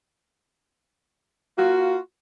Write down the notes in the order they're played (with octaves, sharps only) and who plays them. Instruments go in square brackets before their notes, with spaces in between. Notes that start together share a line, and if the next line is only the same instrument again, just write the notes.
[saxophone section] A#3 F4 F#4